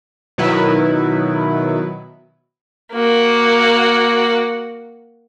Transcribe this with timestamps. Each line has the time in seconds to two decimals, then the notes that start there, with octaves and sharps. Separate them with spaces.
0.38 B2 D#3 F#3 B3 E4 B4
2.93 A#3 F#4